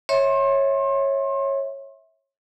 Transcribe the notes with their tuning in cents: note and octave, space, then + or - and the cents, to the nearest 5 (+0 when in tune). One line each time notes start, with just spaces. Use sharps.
C#5 -15 E5 -20 C6 +35